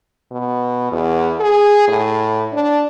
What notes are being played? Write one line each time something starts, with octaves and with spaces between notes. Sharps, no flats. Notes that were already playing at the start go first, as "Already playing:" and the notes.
B2
E2
G#4
A2
D4